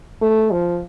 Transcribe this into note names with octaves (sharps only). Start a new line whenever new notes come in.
A3
F3